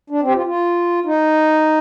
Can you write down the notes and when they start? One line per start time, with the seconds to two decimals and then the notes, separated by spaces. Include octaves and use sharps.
0.10 D4
0.22 C4
0.28 G4
0.35 F4
0.46 F4
1.06 D#4